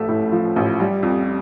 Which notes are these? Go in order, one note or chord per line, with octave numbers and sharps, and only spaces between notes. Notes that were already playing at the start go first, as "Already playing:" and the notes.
Already playing: A1 F3 A3 E5
A2
F3
A1
G3
F2